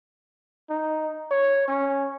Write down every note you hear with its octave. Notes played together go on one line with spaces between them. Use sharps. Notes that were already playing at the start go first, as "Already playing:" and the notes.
D#4
C#5
C#4